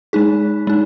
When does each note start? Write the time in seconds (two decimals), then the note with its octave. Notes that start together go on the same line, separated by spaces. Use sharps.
0.13 G#3 D#4 G#4
0.67 G#3 D#4